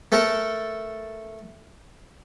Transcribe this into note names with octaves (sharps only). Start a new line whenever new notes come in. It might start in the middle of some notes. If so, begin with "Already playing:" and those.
A3 A4 A#4